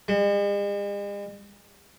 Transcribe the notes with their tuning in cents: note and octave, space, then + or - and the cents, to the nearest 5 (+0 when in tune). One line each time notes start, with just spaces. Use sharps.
G#3 -45